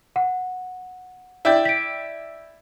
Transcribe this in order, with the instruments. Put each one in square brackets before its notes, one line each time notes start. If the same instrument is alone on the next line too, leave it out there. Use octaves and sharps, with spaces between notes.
[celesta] F#5
[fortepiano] E4 D5 G5
[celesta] B6 D7